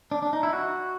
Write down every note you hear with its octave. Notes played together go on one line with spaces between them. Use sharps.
D4
D4
D#4
E4
F#4